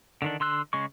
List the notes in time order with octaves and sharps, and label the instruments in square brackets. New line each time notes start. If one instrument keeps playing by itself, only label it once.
[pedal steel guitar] D3 D#3 D4
D3 C6 E6 F#6
C#3 G#3 C#6